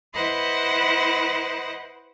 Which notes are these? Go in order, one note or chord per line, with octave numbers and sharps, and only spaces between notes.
E4 B4 C5 D#5 F#5